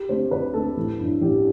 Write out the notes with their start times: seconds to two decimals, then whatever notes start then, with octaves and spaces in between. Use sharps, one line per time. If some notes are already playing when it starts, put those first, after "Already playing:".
Already playing: G4
0.09 D3 A3 C4 C5
0.31 D2 B4
0.54 D3 A3 C4 A4
0.77 A1
1.00 G2 E3
1.21 A1 G4